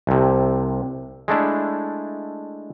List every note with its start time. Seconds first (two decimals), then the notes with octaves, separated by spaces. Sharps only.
0.07 C2 C3
1.28 G#3 A3 D4 E4